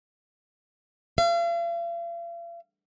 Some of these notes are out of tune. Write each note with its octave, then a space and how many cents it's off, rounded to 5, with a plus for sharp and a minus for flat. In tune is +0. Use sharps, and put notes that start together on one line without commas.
F5 -40